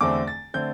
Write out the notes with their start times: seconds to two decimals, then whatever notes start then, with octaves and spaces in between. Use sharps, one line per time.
0.01 E2 D3 A3 C4 D6
0.28 A6
0.54 D3 A3 C4 G6